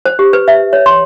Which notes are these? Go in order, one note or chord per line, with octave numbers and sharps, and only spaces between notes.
C5
G4
B4
E5
C#5
C6